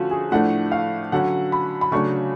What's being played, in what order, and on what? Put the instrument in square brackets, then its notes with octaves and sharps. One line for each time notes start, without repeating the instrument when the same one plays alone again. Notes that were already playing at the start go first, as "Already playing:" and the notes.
Already playing: [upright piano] D3 F3 A3 C#4 F4 F#4
G#4
A2 F3 A3 D4 F#5
F5
D3 F#3 C#4 F#5
B5
B5
C#3 F#3 A3 D4 C#6